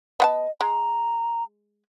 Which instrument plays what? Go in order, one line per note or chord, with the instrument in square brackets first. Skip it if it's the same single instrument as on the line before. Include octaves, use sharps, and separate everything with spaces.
[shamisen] B3 F#5 A5 [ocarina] D#5
[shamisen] G#3 [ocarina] A#5